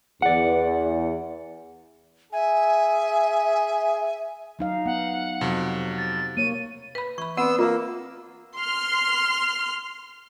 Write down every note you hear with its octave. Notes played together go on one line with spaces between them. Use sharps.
E2 D5 F#5
G#4 E5 G#5
F#3 D#4 F5
B3 F#5
F2 C3 F#3
F#6
A6
A#3 C#5 D#7
B4 B5
E3 B5 C#6
B3 C4 D5 F#5 E6
A#3 F4 A#4 F5
C6 F6